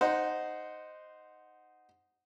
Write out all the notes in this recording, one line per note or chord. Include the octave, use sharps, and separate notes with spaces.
D#4 C5 F#5